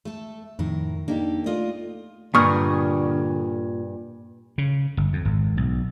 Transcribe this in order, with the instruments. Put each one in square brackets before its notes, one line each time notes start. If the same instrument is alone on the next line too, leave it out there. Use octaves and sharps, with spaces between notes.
[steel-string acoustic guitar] A3 A4
[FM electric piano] F2 D#3 [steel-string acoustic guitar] A2 A#4
[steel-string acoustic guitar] A#3 G4 A4 [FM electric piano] D4 D#4
[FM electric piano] A3 [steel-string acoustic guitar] F4 D5 D#5
[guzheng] G2 [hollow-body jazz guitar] A#2 [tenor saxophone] D3 [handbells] C#6 D#6 F6
[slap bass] C#3
G1
F2
G#1
B1